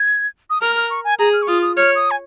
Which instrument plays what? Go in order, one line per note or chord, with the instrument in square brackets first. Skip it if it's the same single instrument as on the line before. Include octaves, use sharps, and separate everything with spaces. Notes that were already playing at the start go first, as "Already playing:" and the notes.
Already playing: [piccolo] G#6
D#6
[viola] A#4 [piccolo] F6
[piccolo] F6
C#6
G#5
[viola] G#4 [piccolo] A#5
[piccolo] F6
C#6
[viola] F4 [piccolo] D#6
[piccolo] D#6
[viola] C#5 [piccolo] F6
[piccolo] D#6
G#5